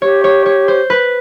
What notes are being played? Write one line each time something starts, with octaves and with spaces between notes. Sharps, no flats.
G4 C#5
C#5
C#5
C5
B4